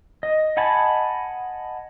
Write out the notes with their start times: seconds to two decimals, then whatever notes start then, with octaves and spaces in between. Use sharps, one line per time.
0.23 D#5
0.57 D#5 F#5 G#5 A5 B5